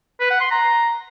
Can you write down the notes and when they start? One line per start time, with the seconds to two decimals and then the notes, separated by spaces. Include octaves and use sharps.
0.20 B4
0.30 F#5
0.40 C6
0.51 A#5